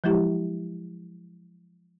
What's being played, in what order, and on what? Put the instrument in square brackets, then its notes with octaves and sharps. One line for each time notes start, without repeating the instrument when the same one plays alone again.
[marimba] F3 F#3 G#3 E4 G4